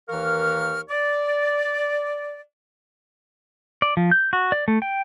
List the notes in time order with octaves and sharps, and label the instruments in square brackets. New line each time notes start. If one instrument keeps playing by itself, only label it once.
[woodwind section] D#2 E3 A#4 F5 C#6 F6
D5
[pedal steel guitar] D5
F3
G6
F#4
D5
A3
G5